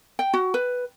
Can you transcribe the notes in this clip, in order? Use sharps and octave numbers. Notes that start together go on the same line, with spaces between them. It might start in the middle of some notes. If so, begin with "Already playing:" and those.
G5
F#4
B4